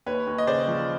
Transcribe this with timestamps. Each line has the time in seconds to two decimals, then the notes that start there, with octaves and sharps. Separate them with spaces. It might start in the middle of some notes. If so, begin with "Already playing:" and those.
0.06 D#2 B4 C#5
0.27 D#2
0.38 D#5
0.47 C#3 C5 D5
0.68 F3